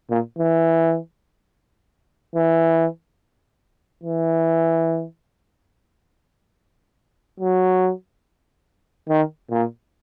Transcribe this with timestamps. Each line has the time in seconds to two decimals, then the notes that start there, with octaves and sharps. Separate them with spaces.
0.10 A#2
0.39 E3
2.35 E3
4.04 E3
7.40 F#3
9.09 D#3
9.50 A#2